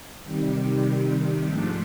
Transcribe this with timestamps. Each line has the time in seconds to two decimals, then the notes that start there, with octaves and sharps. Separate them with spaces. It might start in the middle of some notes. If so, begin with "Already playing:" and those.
0.24 C3 D#3 G3
1.47 G#2 F3 A3 D4